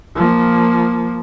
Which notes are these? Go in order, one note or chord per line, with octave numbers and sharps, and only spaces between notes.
F3 A#3